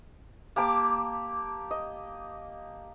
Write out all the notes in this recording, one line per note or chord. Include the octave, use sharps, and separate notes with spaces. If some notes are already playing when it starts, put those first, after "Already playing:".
A#3 G4 A5 D6
D#5